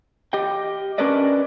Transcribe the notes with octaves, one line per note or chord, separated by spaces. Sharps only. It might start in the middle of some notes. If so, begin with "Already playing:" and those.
G4 D#5 G5
C#4 D4 A#4 B4 D5 D#5